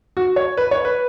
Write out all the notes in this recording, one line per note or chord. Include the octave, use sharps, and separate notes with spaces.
F#4
C#5
B4
C#5
B4